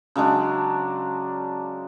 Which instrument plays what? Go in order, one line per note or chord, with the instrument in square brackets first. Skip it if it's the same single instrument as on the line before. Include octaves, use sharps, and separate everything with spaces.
[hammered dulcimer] C#3 F#3 G#3 D4